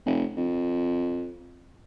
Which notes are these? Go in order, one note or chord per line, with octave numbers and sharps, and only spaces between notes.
F1
F2